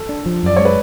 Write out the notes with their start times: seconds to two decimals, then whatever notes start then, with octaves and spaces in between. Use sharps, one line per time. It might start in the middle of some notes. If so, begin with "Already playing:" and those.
Already playing: A4
0.09 D4
0.26 F3
0.43 F#2 D5
0.56 G#3 C#5
0.65 B4